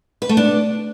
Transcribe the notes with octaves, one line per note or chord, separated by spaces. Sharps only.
B4
A3
D4